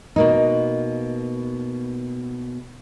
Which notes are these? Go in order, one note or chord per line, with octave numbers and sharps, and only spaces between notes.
B2 A#3 D#4